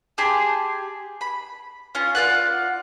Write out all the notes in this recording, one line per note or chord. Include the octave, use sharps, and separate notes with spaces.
G4 G#4 A5 C6
B5
C#4 F4
F4 B4 D5 F#5